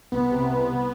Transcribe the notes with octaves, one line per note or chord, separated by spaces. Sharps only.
C2 B3
C3
C2
C2